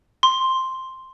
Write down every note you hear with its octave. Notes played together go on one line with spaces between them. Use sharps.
C6